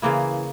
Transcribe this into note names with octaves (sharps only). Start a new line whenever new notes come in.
C#3 E3 A#3 E4